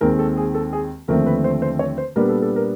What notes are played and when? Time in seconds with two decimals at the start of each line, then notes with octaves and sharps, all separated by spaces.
0.01 D#2 D#3 G#3 C4 A#4
0.19 A4
0.37 G#4
0.55 A4
0.73 G#4
1.08 D#2 D3 F3 A3 C4 A#4
1.26 B4
1.44 C5
1.62 C5
1.79 C#5
1.98 C5
2.16 A#2 G3 B3 D4 A#4
2.29 A4
2.42 A4
2.56 A#4